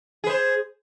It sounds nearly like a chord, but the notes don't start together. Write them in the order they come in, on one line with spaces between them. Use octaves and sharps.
G#4 B4 C5